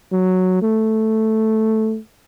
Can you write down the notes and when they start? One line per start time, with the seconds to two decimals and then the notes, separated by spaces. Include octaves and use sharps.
0.12 F#3
0.62 A3